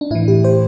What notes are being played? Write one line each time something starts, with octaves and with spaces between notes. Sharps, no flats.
D4
A2 E3 E4
G4
C5